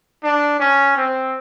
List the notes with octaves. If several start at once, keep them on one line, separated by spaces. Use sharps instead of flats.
D4
C#4
C4